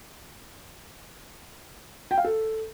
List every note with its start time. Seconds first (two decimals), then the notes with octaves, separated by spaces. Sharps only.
2.11 G5
2.18 F5
2.24 A4